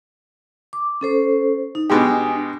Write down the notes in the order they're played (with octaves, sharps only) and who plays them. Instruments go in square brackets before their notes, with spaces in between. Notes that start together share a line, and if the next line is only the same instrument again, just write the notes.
[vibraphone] D6
C#4 A4 C5
D#4
[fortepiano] B2 G#3 G4 [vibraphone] D4 G#5 D#6